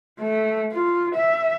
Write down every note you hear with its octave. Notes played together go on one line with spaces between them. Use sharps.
A3
F4
E5